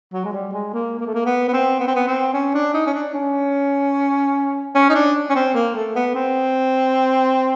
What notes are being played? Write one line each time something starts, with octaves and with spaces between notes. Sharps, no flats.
F#3
G#3
G3
G#3
A#3
A#3
A3
A#3
B3
B3
C4
B3
C4
B3
C4
C#4
D4
D#4
C#4
D4
C#4
C#4
D#4
D4
C#4
C4
A#3
A3
B3
C4